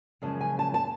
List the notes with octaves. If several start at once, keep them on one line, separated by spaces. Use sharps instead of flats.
F#2 C#3 F3 G#3 A5
G#5
A5
A5